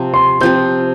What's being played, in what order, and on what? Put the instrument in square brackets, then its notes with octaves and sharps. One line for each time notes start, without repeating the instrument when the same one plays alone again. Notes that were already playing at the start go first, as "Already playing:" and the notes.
Already playing: [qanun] C3 F3 C4
[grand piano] C6
[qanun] C3 F3 C4 [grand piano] G6